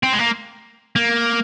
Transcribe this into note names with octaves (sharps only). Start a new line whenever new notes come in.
C4
G#3
A#3
A#3